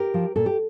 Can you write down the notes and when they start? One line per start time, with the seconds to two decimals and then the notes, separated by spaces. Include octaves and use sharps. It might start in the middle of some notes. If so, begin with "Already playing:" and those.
Already playing: G4 A#4
0.14 F3
0.36 A#2 A4
0.46 G4